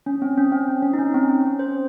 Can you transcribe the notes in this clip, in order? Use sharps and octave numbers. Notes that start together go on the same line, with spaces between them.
C#4
C4
C#4
C4
C#4
C#4
D#4
C#4
C4
C#4
C#4
C5